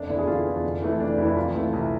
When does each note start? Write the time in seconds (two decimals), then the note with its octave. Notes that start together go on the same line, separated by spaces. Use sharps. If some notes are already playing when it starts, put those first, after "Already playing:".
Already playing: F1 D4
0.08 E2 D3 E4
0.19 G#4
0.27 F1 F4
0.45 E2 D3
0.64 F1
0.81 F2 E3 A3
0.99 F1 D4
1.17 F2 E3 A3 E4
1.36 C2 F4
1.54 C3 E3 A3
1.73 C2